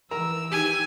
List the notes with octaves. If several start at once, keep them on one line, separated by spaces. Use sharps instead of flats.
E3 A#4 A#5 E6
D#3 G4 G#5